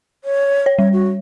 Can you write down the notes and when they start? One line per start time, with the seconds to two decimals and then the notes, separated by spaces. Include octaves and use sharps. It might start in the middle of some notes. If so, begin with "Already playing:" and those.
0.24 C#5
0.66 C#5
0.79 G3 C#5
0.93 F#4